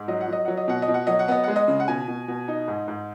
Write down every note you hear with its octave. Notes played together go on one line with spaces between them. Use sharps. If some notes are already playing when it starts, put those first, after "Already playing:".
Already playing: G#2
F#3 D#5
F#5
F#3 D#5
F#3 F#5
D#5
B2 F#5
D#5
B2
F#5
F#3 D#5
F#5
B3 D#5
G#3 F#5
D#5
C#3
F#5
B2 G#5
B2
B2
D#4
G#2
G#2